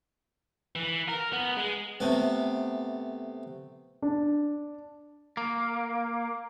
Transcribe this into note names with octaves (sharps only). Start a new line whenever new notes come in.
E3
A#4
B3
G#3
C3 A3 B3
D4
A#3